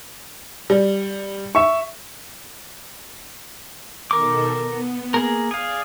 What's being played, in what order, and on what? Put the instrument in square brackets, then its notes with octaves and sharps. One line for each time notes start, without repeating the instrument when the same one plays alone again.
[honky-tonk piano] G3
[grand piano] E5 C#6
[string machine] B2 D#3 A4 [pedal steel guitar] A#4 D6
[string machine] B3
[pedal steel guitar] A#3 G#4 A#4
[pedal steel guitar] G#4 F5 [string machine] D5